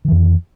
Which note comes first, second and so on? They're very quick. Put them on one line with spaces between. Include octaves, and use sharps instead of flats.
D#3 E3 F2